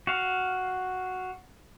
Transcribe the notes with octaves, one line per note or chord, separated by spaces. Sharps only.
F#4 F5